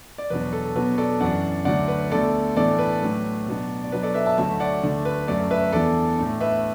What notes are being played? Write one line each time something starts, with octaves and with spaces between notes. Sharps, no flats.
D5
E2 B2 F#3 D4 B4
A4
B2 F#3 B3 D4 B4
A4 D5
F#2 E3 D4 D5 F#5
D2 D3 F#3 D4 D5 F#5
B4
D2 D3 B3 A4 D5
A2 E3 B3 D4 A4 D5
B4
A2 F#3 A3 D4
B2 F#3 B3 D4
D5
B2 F#3 D4 B4
A4 D5
B4 E5
E5 A5
D2 D3 F#3 A3 E5 A5
D5 F#5
D2 D3 A3 D4
B4
F#2 F#3 A3 A4 D5
B4 E5
E2 E3 B3 D4 A4 D5
A2 A3 D4
B4 E5